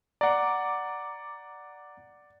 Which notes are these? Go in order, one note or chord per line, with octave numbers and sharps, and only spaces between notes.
D5 F#5 A#5 D6